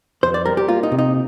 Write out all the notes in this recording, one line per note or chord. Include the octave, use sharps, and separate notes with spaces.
F2 C5
D5
G3 A#4
G4
A#3 F4
D#4
C3
D#4